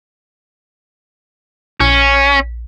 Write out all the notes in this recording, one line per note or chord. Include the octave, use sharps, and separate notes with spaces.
A#1 C#4